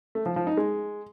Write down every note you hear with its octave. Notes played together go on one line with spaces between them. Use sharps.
A3
F3
F3
D#4
G#3